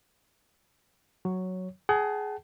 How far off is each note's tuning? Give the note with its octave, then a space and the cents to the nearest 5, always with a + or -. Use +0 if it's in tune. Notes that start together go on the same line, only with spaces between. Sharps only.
F#3 +0 C#5 +0
G#4 +15 F#5 +45 A5 +0